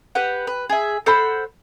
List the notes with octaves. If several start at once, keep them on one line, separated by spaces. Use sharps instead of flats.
G4 B4 F#5
B4
G#4 E5
A4 C5 F#5 B5